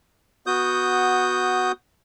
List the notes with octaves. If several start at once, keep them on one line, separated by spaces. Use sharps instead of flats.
B3 F#4 D#6 G6